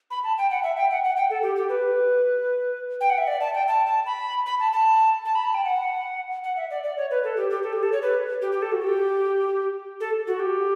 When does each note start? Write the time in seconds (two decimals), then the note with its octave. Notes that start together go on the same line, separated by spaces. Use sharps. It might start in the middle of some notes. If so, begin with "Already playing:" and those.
0.11 B5
0.24 A5
0.38 G5
0.51 F#5
0.63 E5
0.77 G5
0.91 F#5
1.04 F#5
1.16 G5
1.30 A4
1.43 G4
1.56 G4
1.69 B4
3.01 G5
3.10 F#5
3.18 E5
3.28 D5
3.41 A5
3.54 G5
3.68 A5
3.86 A5
4.06 B5
4.46 B5
4.60 A5
4.73 A5
5.25 A5
5.35 B5
5.45 A5
5.54 G5
5.65 F#5
6.44 F#5
6.57 E5
6.71 D5
6.84 D5
6.97 C#5
7.11 B4
7.24 A4
7.37 G4
7.50 G4
7.63 A4
7.73 G4
7.83 A4
7.92 C#5
8.02 B4
8.42 G4
8.52 G4
8.62 A4
8.72 F#4
8.82 G4
10.00 A4
10.27 F#4
10.40 G4